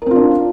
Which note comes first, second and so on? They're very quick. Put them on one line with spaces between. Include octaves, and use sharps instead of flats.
A#4 C4 F4 D4